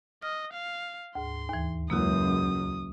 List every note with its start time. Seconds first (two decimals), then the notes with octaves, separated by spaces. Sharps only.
0.22 D#5 F6
0.52 F5
1.15 D2 G#2 C6
1.49 D#2 E3
1.90 C#2 F#2 A#3 E4 F#4 D#6